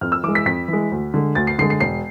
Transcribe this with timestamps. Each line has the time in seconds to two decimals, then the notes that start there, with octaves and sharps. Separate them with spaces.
0.01 F2 F6
0.12 E6
0.23 E3 D6
0.28 G#3
0.35 B6
0.46 F2 B6
0.68 E3
0.73 G#3
0.92 D2
1.14 D3 G#3
1.35 D2 A6
1.47 C7
1.59 D3 C7
1.62 G#3
1.70 C7
1.80 E1 C7